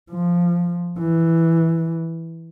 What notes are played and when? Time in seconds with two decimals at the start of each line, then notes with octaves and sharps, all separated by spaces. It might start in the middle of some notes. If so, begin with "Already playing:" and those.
0.11 F3
0.99 E3